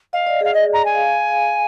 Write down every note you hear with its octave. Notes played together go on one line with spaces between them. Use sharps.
D#5 F5
D5
G#4 F5
D#5
A#5
G#5
F5